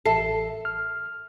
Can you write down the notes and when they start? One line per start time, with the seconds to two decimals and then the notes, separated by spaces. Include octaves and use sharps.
0.06 A1 A4 E5 C7
0.65 F6